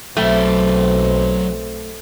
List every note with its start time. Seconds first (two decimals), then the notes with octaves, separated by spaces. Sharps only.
0.17 B1 F#3 A3 C4 G5